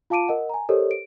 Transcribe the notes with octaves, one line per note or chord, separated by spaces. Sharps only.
F4 F5 A5 D6 D7 D#7
A#4 D#5 F#5
G#5 A#5
G4 A4 A#4 C5 C#5 D#5
D7